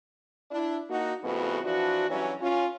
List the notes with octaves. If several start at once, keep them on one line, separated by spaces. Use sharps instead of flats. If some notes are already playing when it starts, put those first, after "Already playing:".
D4 E4
A#3 D#4 F#4
F2 A2 C#3 B3 F#4
E3 F3 D4 F#4
G2 E3 F#3 C#4
C#4 F4